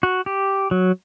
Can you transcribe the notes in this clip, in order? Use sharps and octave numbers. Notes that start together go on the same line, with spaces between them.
F#4
G4
F#3